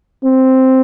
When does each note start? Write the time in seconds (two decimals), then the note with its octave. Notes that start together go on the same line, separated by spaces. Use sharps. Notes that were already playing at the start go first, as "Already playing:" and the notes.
0.24 C4